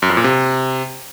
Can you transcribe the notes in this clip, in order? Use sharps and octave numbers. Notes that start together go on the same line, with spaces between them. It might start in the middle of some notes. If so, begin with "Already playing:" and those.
F#2
F2
A#2
C3